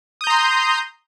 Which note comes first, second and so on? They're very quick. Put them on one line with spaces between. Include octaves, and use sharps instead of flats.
D#6 G6 A#5 C6